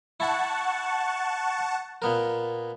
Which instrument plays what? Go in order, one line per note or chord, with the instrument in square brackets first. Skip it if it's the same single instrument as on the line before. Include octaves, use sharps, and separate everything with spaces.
[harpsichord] E4 [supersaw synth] F#5 A5 C#6
[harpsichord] A#2 B3 A#4